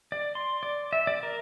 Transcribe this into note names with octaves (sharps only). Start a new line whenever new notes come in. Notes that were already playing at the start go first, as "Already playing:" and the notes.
D5
C6
D5
E5
D5
A#4